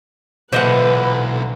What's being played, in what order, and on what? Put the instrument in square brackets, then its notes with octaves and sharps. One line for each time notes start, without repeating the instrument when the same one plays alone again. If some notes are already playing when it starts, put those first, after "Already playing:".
[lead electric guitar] B1 [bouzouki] A#2 D3 E3 [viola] B4 [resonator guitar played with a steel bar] C5 D#5 F#5